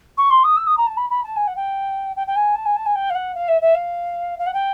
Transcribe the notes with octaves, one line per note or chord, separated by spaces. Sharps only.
C#6
C6
D#6
E6
D#6
A#5
A5
B5
B5
A5
G#5
F#5
G5
G5
G5
G#5
A5
G#5
A5
G#5
G5
F5
F#5
F5
E5
E5
F5
F5
F#5
G5